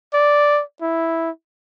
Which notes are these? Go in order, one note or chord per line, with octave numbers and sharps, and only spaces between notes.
D5
E4